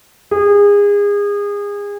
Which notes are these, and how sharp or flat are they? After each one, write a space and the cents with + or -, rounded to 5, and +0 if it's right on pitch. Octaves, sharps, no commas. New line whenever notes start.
G#4 -30